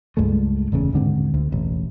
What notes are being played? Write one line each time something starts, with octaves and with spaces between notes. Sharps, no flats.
C#2 G2 G#3 A3
F#1 E2 A2 C#3
D#1 G#2 D3 C4
D2
E1 A1